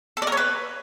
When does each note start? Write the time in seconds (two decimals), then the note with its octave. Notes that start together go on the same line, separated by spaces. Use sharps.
0.17 A4
0.22 D5
0.27 A#4
0.32 C#5
0.37 B4